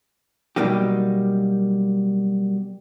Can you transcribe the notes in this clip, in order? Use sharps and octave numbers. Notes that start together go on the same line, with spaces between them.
B2 F#3 G3 A#3 D#4 G4